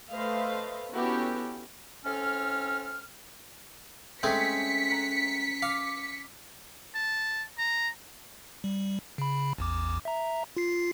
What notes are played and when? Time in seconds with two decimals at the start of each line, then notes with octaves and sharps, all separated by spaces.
0.11 A3 A4 B4 C5 D#5 F5
0.91 B3 C#4 E4 F#4 G4 A4
2.05 A2 C4 C#4 A4 F6
4.23 G#3 A3 C4 C#4 B6 C#7
4.90 A#5 F#6
5.62 F5 D6 F6
6.95 A5
7.58 A#5
8.64 G3
9.18 C#3 B5
9.58 A1 E2 D6
10.05 E5 A#5
10.57 F4 C7